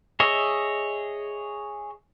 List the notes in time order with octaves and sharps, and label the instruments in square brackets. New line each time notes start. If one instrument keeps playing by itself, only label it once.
[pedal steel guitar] G#4 C#5 D#5 E5